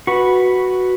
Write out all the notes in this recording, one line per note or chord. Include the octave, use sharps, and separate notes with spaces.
F#4 B4